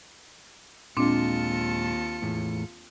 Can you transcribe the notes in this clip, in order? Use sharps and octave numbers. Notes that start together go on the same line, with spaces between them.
D#2 A#2 G#3 C4 D4 F4 A5 C#7
E2 A2